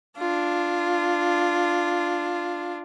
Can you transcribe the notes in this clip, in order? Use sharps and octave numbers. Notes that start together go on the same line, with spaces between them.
D4 F4